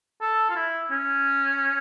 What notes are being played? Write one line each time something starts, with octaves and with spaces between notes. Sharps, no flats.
A4
F4
E4
C#4